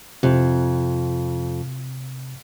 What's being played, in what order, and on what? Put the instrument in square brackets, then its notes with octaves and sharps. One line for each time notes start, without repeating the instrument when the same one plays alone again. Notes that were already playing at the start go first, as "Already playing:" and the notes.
[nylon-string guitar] F2 [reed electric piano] C3